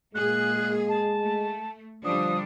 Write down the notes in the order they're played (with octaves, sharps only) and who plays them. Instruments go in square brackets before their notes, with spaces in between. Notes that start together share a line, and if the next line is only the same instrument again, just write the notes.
[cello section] A#2 A#3 G#4 [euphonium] G#3 [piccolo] F#6
[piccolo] A5
[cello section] A3
[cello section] D3 G3 D4 [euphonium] F3 [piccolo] D#6